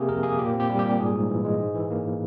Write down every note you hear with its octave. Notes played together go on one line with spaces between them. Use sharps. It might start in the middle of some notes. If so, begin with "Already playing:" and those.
Already playing: C3 A#3 G4 G#4
F2 A#4
A#3 G#4
A#2 G4
C4
G4
G3
G4
A#2
G#2 G#4
G#2
E3
G#3
G#2
E3
A#3